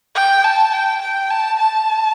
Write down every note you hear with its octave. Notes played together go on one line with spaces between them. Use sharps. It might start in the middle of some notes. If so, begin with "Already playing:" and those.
G5
A5
G5
G5
A5
A5